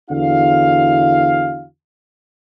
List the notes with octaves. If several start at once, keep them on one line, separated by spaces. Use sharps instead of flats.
E2 D3 E4 F#4 F5